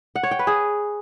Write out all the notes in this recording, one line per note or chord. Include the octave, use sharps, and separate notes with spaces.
F#5
C#5
G5
B4
G#4